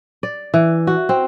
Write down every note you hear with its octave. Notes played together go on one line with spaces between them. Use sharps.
D5
E3
F#4
C4